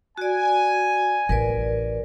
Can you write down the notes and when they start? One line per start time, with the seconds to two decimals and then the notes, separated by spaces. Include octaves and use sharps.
0.18 F#4 D5 G#5
1.29 A1 A#4 B4 D5